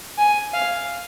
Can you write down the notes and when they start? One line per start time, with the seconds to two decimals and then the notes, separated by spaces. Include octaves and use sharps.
0.18 G#5
0.53 F5